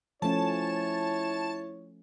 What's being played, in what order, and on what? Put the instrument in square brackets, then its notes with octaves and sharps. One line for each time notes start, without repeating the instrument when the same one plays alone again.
[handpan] F3 A3 C#4 [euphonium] E4 [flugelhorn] C#5 [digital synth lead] A5